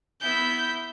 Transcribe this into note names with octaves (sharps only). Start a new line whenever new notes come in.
B3 E4 G6 B6